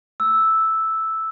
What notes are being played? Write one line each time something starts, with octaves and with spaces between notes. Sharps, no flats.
E6